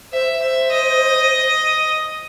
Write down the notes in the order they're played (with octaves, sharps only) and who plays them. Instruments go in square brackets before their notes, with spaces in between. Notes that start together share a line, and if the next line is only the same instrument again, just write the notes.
[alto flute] C5 [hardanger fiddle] E5
[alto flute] C5
[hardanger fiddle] E5
D#5